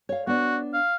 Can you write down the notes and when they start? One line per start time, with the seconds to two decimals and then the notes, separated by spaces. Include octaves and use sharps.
0.09 C#5 F5
0.27 B3 D4 F#4
0.74 F5